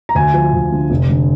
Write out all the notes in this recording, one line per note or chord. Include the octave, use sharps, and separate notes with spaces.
A#5
D2 G#5
F3
D2
D3
F1
D3